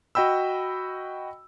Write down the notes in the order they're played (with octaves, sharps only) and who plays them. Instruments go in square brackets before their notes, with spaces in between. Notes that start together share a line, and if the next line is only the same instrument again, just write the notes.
[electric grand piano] F#4 D#5 G5 B5 E6